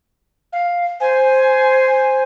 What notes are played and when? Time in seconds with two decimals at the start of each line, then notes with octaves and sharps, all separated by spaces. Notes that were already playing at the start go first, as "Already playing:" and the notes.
0.53 F5
1.00 C5 G#5